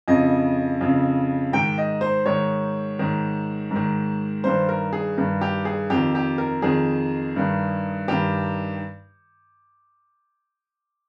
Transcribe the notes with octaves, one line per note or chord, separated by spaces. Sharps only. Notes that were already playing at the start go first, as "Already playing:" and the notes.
F2 C#3 D#5
F2 C#3
G#2 D#3 G5
D#5
C5
G#2 D#3 C#5
G#2 D#3
G#2 D#3
G2 D#3 C5
A#4
G#4
G2 D#3
G4
G#4
F2 D#3 G4
G4
A#4
F2 D#3 G#4
G2 D#3
G2 D#3 G4